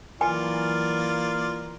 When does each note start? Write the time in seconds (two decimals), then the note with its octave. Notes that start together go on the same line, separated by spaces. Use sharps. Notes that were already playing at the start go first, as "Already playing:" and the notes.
0.21 E3 F#3 A#3 F4 A#4 D5 G#5